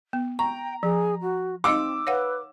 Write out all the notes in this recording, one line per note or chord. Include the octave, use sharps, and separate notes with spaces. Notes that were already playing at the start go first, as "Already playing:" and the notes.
B3
G5 A#5 C#6
F3 G#4
F#4
C4 D#4 D#5 F5 D6 E6
B4 C#5 F5 F#5